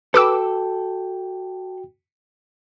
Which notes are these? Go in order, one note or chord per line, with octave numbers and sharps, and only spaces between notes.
F#4 A4 B4 G5 D6 E6